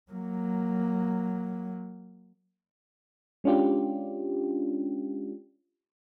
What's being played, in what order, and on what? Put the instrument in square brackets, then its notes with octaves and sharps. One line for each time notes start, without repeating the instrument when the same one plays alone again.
[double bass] F#3 A#3
[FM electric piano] G#3 C#4 D4 F4 G4